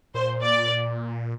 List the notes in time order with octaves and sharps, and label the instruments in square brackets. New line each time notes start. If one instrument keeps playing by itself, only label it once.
[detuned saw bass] A#2 [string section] C5
[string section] D5